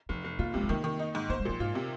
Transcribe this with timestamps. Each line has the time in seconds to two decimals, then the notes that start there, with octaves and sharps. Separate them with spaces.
0.09 F1 F3
0.24 F1
0.39 A#3 F4
0.54 C3 G#3
0.63 C4
0.69 D#3 A#3
0.84 D#3
0.99 D#4
1.15 G#2
1.30 A#3 C5
1.40 G#3
1.45 A#2 F3
1.60 G#2 F4
1.75 C3